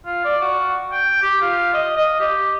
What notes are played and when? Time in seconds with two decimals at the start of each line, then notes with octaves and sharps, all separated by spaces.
0.06 F4
0.24 D5
0.41 F#4
0.92 G5
1.22 G4
1.41 F4
1.73 D#5
1.96 D#5
2.20 G4